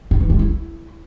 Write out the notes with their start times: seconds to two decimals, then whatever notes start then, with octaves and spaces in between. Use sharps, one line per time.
0.11 D#4
0.20 E3
0.30 G#3
0.39 E4